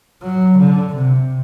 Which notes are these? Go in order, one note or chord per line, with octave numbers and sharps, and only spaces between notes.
F#3
D3
C3